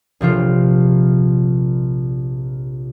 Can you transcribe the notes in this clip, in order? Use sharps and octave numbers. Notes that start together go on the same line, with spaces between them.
A#1 C3 F3 F4